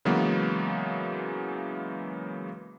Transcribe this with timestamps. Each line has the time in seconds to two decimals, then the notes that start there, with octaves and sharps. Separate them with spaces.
0.05 C#3 E3 F#3 G#3 A#3 B3